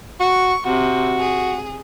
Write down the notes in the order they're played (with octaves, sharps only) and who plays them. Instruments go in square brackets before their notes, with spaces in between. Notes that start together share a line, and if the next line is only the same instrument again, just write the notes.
[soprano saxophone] F#4 [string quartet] C#6
[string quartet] C3 [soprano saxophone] F#4
[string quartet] G#4